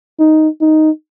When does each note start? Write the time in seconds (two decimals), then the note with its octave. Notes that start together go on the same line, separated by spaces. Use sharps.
0.19 D#4
0.61 D#4